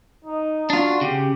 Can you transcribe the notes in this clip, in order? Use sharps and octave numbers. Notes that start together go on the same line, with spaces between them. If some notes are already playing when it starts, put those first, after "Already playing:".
D#4
D4 F4 F#4
C#3 G4